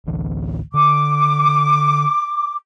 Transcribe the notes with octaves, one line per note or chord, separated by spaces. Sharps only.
A1 D2 E3
D3 D6